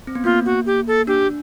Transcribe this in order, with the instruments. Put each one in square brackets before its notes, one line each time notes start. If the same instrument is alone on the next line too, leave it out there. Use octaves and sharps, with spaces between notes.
[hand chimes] C4
B3
[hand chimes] A#3 [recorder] F4
[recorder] F#4
G4
A4
[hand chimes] D4 [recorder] G4